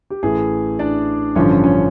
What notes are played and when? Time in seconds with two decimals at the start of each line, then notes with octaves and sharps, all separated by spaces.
0.10 G4
0.23 A1 A2 E3 G#4
0.79 D4 D5
1.35 A1 G2 D3 F3 C#4 C#5
1.64 C#4 C#5